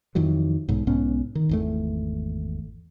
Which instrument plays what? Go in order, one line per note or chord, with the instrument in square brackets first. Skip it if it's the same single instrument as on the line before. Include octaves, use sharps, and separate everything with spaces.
[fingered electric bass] F2 D#3 E3 F#3
B1 G#2
B1 G#2 B3 C#4
D#3
G#1 E2 A3